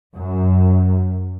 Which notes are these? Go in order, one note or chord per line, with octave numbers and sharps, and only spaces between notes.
F#2